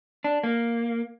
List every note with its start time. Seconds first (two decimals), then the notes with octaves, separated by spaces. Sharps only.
0.24 D4
0.44 A#3